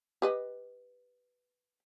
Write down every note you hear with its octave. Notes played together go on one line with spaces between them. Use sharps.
G4 B4 D#5